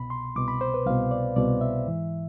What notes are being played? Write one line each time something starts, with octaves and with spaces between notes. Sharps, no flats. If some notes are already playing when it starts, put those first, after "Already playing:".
Already playing: C2 B2 B5
C6
C2 B2 D6
B5
C5
B4
C2 B2 F5
D5
C2 B2 D5
E5
G#2 E3